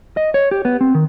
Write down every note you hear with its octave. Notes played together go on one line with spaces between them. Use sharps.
D#5
C#5
G4
B3
C4
D#3